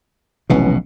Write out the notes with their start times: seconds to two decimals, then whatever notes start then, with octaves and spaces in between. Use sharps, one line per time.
0.50 F1 B1 B2 E3 G#3 C#4